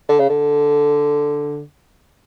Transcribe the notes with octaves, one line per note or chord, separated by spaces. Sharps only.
D3
C#3
D3